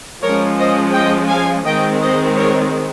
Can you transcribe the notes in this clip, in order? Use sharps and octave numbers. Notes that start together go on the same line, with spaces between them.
F3 G#3 C#4 A#4 C#5
C5 D#5
D#5 G5
F5 G#5
D#3 G#3 C4 D#5 G5
C5 D#5
A#4 C#5